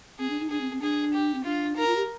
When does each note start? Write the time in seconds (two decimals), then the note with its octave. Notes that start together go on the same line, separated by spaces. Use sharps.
0.19 C4 G#4
0.30 D4
0.40 D#4
0.50 D4 G#4
0.61 C4
0.72 C4
0.81 D4 G#4
1.14 G4
1.34 C4
1.44 D4 F4
1.76 D#4 A#4
1.87 F4
1.96 G4